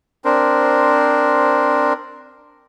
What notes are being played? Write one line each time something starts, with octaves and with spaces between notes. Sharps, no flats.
C4 D4 A#4 C5